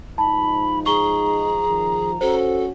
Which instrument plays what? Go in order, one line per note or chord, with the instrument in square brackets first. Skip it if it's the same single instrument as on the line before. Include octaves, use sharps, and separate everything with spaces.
[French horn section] G#2 F3 D#4 [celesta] A5 [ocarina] B5
[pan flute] G#4 [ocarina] A#5 [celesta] C#6 G7
[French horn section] D#3 F3
[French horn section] C#4 F#4 [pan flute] A4 [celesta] C5